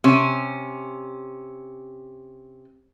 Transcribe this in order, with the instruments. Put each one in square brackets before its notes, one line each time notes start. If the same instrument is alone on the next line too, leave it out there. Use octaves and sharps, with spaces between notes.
[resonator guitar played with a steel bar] C3 C#4